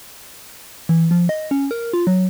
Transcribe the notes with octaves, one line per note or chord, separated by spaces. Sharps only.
E3
F3
D#5
C#4
A#4
F4
F#3